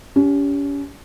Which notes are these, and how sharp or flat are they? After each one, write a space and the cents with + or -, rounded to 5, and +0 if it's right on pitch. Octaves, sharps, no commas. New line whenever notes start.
C#4 +35 G4 +5